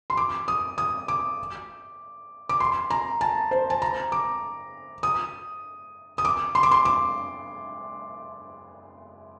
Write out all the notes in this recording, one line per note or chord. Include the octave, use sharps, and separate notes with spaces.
C6
D6
D#6
D#6
D6
D6
C6
A#5
A5
C5
A5
A#5
D6
D#6
D#6
D6
C6
D6
C6
D6